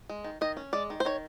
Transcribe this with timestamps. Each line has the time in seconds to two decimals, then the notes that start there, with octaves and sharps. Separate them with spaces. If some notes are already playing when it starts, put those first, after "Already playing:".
0.09 G#3
0.24 D#3
0.41 D#3 D#5
0.57 C#4
0.73 G#3 D5
0.90 D#3
1.00 C5
1.05 D#3 C#5